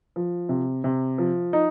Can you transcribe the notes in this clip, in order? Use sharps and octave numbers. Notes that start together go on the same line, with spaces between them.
F3
C3
C3
F3
D#4